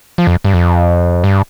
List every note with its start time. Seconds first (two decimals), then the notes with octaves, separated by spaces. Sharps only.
0.18 F3
0.27 F2
0.44 G2
0.54 F2
1.24 G2